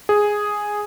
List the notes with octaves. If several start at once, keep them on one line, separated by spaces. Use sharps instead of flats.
G#4